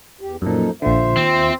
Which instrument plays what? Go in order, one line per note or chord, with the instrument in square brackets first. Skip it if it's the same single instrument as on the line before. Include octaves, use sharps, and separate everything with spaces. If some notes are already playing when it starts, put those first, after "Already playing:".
[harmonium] E2 G4
[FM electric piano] F#2 A#2 [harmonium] F3 D#4 A4
[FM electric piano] A#1 D3 [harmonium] F4 E5 [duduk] C5
[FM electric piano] D#2 [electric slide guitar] C4